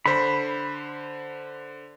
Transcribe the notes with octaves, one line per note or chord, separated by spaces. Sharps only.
D3 C5 B5